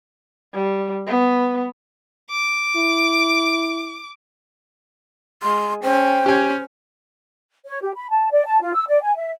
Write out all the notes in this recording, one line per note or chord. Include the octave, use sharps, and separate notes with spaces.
G3
B3
D6
E4
G#3 C6
C#4 C5 G5
C#4 G4 G#5
C#5
G4
B5
A5
D5
A5
F4
E6
D5
G#5
E5